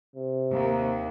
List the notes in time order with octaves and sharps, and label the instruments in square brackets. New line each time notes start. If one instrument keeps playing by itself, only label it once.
[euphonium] C3
[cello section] D#2